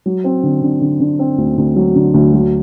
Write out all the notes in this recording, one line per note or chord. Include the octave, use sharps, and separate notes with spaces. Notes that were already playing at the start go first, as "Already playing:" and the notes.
F#3
C4
D3
D3
D3
D3
C4
D2
D2
F#3
D3
D2
F#3